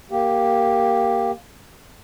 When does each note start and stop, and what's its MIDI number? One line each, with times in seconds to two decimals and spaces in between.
0.11 1.31 58
0.11 1.31 67